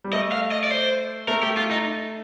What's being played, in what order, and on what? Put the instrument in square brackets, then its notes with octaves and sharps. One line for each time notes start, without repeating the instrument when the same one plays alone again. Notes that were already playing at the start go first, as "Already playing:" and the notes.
[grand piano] G3
[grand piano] A3 [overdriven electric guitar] D#5
[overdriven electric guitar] F5
D#5
D5
C5
[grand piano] A3 [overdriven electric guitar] A#4
[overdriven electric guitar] G4
F4
D#4